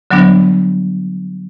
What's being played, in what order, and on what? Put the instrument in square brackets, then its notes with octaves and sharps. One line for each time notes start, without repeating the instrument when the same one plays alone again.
[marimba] D3 F#3 G3 B3 D4